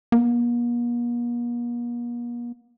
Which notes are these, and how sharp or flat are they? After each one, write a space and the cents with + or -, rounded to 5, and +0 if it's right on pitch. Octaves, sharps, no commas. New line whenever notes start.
A#3 +45